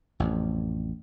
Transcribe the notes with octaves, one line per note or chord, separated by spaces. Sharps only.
A1 F2